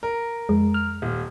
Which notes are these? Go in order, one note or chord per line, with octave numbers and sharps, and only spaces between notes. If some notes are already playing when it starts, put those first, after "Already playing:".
A#4
F2 G#3
F6
D#1